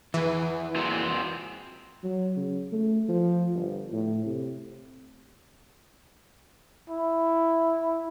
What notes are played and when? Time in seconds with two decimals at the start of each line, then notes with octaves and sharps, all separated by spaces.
0.14 E3 E4 G#4
0.76 A#2 C4 F#4 G#4
2.04 F#3
2.36 C#3
2.72 A3
3.09 F3
3.55 G1
3.92 A2
4.26 C3
6.90 E4